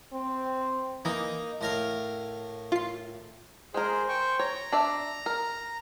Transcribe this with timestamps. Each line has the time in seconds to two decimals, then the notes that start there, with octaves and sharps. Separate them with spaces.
0.13 C4
1.05 E3 A#3 D#4
1.61 A2 A#4 F5
2.72 F4 C7
3.74 G#3 G#4 A#4 C5
4.08 C5 G5 C#6
4.39 C#5 A#5
4.72 D4 D5 E5
5.26 A#4